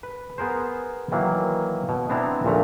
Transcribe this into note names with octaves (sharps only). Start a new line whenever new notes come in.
B4
B3 G#4 A#4 C5
D#3 E3 F#3 A#3
B2
B3 C4 D4 E4 A#5
A#1 A#2 A3 A#5